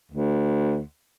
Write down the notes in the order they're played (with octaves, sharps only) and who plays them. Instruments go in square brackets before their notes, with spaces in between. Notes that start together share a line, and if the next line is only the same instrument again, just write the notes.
[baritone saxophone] D2